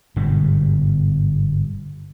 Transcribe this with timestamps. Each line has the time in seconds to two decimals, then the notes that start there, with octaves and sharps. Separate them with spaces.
0.16 G1 G#2 B2